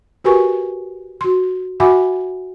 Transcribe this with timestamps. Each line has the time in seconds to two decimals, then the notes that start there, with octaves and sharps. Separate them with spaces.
0.24 F#4 G4 A#4 B4 G#5 C#6
1.21 F#4 C6
1.80 F#4 E5 F#5 G#5 B5 D6